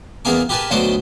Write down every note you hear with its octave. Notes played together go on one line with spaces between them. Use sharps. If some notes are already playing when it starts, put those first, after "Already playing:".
E2 A#3 B3 G#4 A#4 D6
G4 A#4 B4 G#5 A5
D2 F#3 B3 C5 D#5 D6